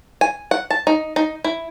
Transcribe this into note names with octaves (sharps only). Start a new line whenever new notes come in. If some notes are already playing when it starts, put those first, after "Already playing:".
G#5
F#5
A5
D#4
D#4
E4